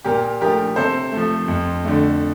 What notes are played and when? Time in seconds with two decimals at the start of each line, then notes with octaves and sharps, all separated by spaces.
0.04 A#2 G4 A#4
0.41 F3 A3 G4 A#4
0.76 C3 A4 C5
1.12 A3
1.17 F3
1.48 F2
1.84 D3 A3